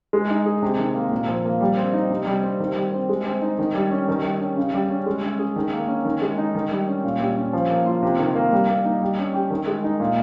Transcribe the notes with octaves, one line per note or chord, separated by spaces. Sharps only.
G#3
D#4
G#4
C3
D#3
A#3
A#2
F3
A#3
G3
C4
D#4
C3
G3
C4
D#3
G3
C4
G#3
C4
D#4
D#3
G3
C#4
D#3
G3
C#4
C#3
G3
C#4
G#3
C#4
G#4
D#3
A#3
C#4
D#3
G#3
D#4
D#3
G3
C#4
A#2
G3
C#4
F3
A#3
F4
C3
D#3
A#3
G3
A#3
D#4
G3
C#4
G4
D#3
G#3
D#4
A#2